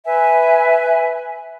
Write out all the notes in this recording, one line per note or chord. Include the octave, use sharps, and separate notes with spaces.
B4 E5 G#5